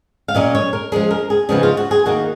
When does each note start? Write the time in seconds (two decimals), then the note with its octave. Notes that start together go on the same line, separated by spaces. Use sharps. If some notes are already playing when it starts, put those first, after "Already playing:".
0.28 F5
0.35 A#2 F#3 C#4 D#5
0.55 C#5
0.73 A#4
0.92 F3 G#3 C#4 G#4
1.11 A#4
1.30 G#4
1.49 C#3 F3 B3 D#4 G#4
1.63 F4
1.77 F#4
1.91 G#4
2.06 D#3 A#3 D#4 F#4